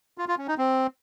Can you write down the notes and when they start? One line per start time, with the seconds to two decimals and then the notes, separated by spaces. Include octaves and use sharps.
0.18 F4
0.28 F4
0.38 C#4
0.48 D#4
0.58 C4